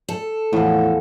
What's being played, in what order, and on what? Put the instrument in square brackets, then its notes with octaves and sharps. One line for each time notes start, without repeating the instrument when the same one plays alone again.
[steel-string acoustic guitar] A4
[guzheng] E2 F3 [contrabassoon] A2